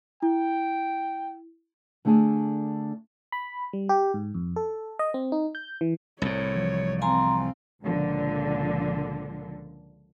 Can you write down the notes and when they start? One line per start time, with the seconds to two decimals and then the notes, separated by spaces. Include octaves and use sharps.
0.22 E4 G5
2.05 D3 A3 D4 G#4 G#5
3.32 B5
3.73 G3
3.89 G4
4.14 G#2
4.34 F2
4.56 A4
4.99 D#5
5.14 C4
5.32 D#4
5.55 G6
5.81 E3
6.22 C2 A2 C#5
6.55 E3 F3
7.02 C4 F5 G#5 A#5 C6
7.82 C#2 A#2 D3 F3